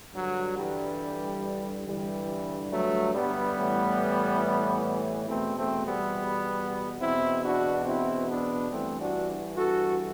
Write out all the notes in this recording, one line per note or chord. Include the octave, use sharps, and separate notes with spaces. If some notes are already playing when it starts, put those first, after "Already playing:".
G2 D3 F#3
E3 G3
G2 D3 E3 G3
F#3 A3
G3 B3
A2 E3
E2 B2 A3 C4
A3 C4
G3 B3
E2 B2 C4 E4
D4 F#4
C4 E4
B3 D4
G2 E3 A3 C4
D4 F#4
F#4 A4